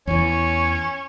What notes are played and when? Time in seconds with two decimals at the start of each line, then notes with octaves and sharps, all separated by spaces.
0.07 E2 E3 C#4 C#5